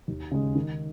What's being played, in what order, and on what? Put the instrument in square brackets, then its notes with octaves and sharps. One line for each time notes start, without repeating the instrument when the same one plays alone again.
[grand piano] D#2
C#3 G#3
D#3